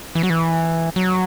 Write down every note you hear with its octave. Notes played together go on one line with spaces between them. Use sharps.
E3
F#3
E3
F#3